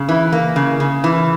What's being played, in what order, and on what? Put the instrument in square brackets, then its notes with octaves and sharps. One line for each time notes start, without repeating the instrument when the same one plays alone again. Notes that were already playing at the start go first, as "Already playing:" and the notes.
Already playing: [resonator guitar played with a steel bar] C#3
E3
A#3
C#3
C#3
E3